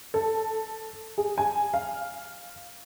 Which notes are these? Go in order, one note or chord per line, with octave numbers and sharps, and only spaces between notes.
A4
G#4
G#5
F5